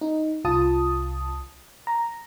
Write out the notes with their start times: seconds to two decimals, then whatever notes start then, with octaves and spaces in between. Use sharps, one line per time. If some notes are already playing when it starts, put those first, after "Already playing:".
0.01 D#4
0.45 C2 F4 A5 D#6
1.87 A#5